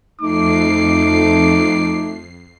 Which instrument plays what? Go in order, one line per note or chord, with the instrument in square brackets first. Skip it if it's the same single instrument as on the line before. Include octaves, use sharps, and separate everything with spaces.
[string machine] F2 C7 [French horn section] A3 [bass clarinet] D#4 [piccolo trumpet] D6